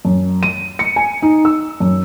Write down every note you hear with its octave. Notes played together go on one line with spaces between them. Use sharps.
F#2
D#7
C#7
G#5
D#4
E6
F#2